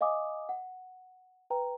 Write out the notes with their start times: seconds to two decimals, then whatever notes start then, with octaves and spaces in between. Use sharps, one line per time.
0.01 D#5 F5 G#5 D6 D#6
0.49 F#5
1.50 B4 G5 A#5